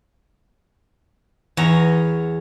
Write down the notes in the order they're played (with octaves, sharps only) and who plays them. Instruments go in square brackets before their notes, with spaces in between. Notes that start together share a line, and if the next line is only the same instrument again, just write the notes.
[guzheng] E2 C#5 A#5